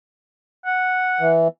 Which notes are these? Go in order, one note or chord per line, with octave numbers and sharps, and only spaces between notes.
F#5
E3